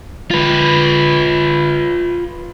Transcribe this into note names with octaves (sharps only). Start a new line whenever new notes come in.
F4 B4